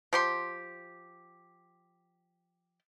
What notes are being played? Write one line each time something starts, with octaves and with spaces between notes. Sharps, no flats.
F3 G4 C6